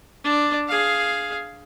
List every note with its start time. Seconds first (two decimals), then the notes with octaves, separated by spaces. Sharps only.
0.24 D4 D5
0.68 G#4 F5